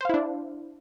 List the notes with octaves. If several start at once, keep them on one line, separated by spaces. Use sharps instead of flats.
D4 E4 C5 F5